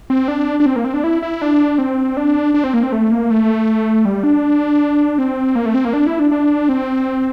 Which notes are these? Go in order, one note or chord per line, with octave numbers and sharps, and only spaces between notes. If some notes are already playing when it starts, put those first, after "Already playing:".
C4
D4
D4
C4
A#3
C4
D4
E4
E4
D4
C4
D4
D4
C4
A#3
C4
A3
A#3
A3
G3
D4
C4
A#3
A3
C4
A#3
D4
E4
D4
D4
C4